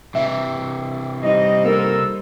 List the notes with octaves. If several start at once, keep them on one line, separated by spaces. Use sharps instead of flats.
C3 E3 E5
G3 D#4 C5 D#5
A#3 A4 A#4 E6